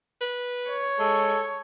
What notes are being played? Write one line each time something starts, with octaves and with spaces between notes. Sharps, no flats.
B4
C#5
G#3 A4